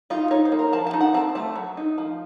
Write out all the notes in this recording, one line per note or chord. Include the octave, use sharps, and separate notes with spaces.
D#4 F4
D#4 C#5
C5
A#3
A#4
F3 A5
A5
D#4
F#5
C4 A5
A3 A5
F#3
D#4
F3